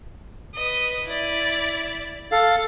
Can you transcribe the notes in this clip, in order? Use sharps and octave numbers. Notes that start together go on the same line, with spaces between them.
B4 D#5
E4 D5
A4 F5 A6